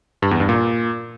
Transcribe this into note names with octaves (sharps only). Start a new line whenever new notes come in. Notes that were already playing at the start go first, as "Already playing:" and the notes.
G2
E2
G2
A#2